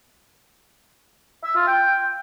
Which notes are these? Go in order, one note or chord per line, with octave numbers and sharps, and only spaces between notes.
E5
F4
G5